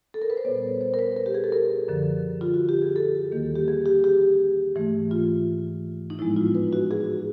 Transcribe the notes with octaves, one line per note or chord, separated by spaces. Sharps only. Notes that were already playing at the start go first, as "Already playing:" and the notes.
A4
A#4
B4
C5
A#2 G3 B3 C#5
C5
A#4
B4
A#4
G4
G#4
A4
A#4
F#2 D3 F3
F4
F#4
G4
G#4
A4
D#2 D#3 G3 A#3
G4
G#4
G4
G4
G#2 E3 A3
F4
D#4
A2 F3 G#3 B3 E4
F4
B4
F#4
G#4